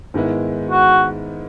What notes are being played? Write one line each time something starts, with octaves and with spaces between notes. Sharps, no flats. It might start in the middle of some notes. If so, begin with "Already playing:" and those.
G#2 D#3 G#3 B3 E4
F#4